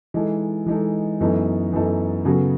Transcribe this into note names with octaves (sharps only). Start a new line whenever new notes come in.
E3 G#3 D#4 A4
E3 G#3 D#4 A4
F#2 E3 B3 D#4 A4
F#2 E3 B3 D#4 A4
C#3 F#3 B3 F#4 A4